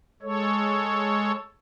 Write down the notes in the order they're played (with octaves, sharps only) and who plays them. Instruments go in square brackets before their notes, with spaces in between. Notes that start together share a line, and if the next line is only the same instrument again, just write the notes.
[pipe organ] G#3 A4 C#5